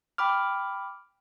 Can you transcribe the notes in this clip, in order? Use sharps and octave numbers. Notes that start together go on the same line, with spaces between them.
G5 B5 D6 F6